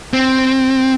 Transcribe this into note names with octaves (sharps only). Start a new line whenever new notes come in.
C4